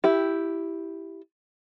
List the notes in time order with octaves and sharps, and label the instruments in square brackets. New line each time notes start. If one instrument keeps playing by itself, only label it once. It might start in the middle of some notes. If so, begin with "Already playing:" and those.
[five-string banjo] E4 G4